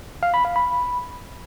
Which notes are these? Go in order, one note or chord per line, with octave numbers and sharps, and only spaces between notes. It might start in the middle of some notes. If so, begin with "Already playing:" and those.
F5
B5
F5
B5